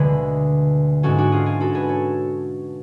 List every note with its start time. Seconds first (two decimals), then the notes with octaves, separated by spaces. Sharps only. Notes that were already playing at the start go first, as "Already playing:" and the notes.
Already playing: D2 B2 D3 G#3 G#4 B4
1.03 G#2 G#3 C#4 F#4 A4
1.18 D4 F#4
1.32 F4 G#4
1.46 F4 G#4
1.60 F#4 A4
1.75 G#4 B4
1.89 A4 C#5